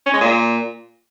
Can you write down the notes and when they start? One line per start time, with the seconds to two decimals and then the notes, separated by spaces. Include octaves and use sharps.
0.06 C#4
0.14 G#3
0.21 A#2